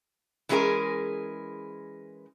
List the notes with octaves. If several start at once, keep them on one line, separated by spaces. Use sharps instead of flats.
E3 G#3 C#4 G#4 A#4